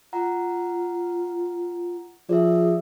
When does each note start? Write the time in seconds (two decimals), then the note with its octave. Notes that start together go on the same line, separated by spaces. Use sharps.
0.13 F4 F#5 A#5
2.29 F3 G#4 D5 E5